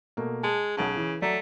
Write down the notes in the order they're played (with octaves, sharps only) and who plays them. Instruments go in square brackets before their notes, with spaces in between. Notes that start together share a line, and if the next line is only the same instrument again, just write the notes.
[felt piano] B2 A3 A#3
[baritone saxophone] G#3 [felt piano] A5
[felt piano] B1 F#5 A5 [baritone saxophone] C#3
[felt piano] E3
[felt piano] F#3 D5 A#5 [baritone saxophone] A3